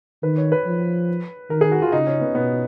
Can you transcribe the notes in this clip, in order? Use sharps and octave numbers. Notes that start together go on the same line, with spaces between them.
D#3 B4
C#5
B4
F3
D#3 A#4
G#4
F#4
F4
C#3 D#4
C#4
B3
B2 B3